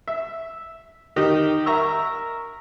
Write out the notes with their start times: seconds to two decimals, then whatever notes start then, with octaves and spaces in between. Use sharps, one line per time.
0.08 E5
1.16 D#3 G4 D#5
1.66 A#4 E5 A#5 C#6 E6